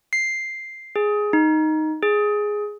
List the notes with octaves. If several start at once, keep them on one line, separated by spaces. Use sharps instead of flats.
C7
G#4
D#4
G#4